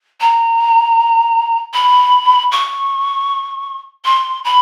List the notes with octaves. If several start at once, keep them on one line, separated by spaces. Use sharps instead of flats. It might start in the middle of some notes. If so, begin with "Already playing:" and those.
A#5
B5
C#6
C6
B5